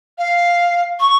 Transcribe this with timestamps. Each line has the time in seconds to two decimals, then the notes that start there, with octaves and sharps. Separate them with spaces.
0.18 F5
1.00 C#6